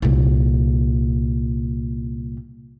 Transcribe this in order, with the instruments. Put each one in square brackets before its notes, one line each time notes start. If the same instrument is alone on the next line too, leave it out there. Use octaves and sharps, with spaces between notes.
[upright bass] C2 A#2